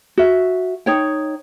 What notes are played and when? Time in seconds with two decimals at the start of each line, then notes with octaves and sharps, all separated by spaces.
0.18 F#4 E5
0.86 D#4 C#5 G5